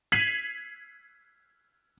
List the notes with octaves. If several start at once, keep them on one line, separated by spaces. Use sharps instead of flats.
G#6 B6 C7 D#7 F7 F#7